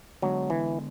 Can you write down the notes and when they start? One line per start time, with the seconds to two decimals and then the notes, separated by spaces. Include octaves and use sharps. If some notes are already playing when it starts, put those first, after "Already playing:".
0.22 D3 F#3 G#3 B3 D4
0.50 E3